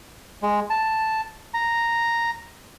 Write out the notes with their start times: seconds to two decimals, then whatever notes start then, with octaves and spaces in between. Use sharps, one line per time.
0.42 G#3
0.70 A5
1.54 A#5